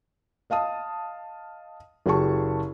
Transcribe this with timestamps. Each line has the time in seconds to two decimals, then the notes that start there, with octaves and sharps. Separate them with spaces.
0.50 D#5 F5 A5 D#6
2.06 F#1 F#3 G4 G#4 A5 C#6